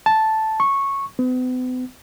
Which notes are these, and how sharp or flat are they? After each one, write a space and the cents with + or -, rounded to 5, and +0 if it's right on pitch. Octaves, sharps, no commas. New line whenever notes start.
A5 -5
C#6 -10
B3 +40